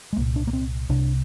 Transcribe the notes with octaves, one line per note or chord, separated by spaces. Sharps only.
G#3
C2 A#2 A#3
D4
A#3
C4
C2 C3 D4